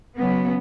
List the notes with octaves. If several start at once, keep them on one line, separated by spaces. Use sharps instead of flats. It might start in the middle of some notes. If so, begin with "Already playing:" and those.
C#3 F#3 B3